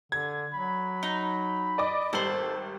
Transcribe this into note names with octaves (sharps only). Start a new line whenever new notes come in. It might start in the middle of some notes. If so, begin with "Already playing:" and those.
D3 G#6
F#3 B5
D#4
D5 D#5 D6
G#1 G3 A4 C5 F#7